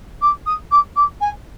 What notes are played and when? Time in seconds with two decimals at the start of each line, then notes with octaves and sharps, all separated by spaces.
0.22 D6
0.46 D#6
0.71 D6
0.96 D6
1.21 G#5